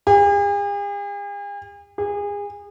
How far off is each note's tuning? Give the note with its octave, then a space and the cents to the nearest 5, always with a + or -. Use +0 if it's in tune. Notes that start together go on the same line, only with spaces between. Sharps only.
G#4 -45
G#4 -30